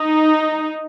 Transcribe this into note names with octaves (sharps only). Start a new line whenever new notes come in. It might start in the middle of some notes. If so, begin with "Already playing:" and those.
Already playing: D#4